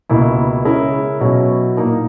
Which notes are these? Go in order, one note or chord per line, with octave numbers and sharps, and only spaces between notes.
C#2 B2 A#3 E4
C#3 G#3 C#4 E4 A#4
B2 F#3 C#4 E4
A#2 A#3 D#4 A#4